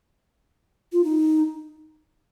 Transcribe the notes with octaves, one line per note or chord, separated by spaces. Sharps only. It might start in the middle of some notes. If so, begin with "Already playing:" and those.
F4
D#4